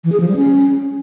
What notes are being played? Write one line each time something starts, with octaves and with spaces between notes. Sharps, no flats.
E3
G#4
F3
G3
C#4